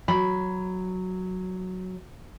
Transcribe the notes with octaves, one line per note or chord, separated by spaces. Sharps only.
F#3 B5